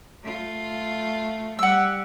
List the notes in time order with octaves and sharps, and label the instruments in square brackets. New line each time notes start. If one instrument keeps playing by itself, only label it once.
[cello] A3 F4
[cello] G3 [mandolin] F#5 E6